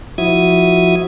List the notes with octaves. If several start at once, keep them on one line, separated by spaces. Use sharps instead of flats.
F3 E4 F#4 E5 D#6 G#6